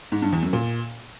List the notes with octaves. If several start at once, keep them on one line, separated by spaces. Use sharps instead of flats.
G#2
G2
E2
F#2
A#2